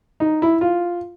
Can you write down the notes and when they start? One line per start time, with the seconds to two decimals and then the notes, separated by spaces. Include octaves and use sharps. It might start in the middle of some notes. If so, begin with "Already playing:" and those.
0.20 D#4
0.42 E4
0.61 F4